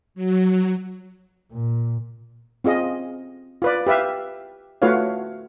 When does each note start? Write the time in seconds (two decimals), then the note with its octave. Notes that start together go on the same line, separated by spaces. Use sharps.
0.14 F#3
1.51 A#2
2.64 C4 F4 G#4 D#5
3.62 F4 B4 D5
3.87 G4 B4 E5 F5
4.82 A3 F4 F#4 B4 C#5 F5